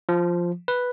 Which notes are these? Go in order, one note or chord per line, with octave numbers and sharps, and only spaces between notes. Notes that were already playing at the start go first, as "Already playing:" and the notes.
F3
B4